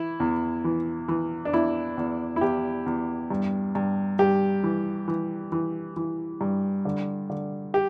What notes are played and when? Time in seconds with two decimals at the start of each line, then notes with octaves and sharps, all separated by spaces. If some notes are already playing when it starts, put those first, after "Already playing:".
Already playing: E3 E4
0.20 E2
0.64 E3
1.08 E3
1.45 D4
1.53 E2 E4
1.97 E2
2.36 E4
2.41 E2 G4
2.86 E2
3.30 G2
3.75 G2
4.19 G2 G4
4.64 E3
5.08 E3
5.52 E3
5.96 E3
6.41 G2
6.85 D3
7.30 D3
7.74 G4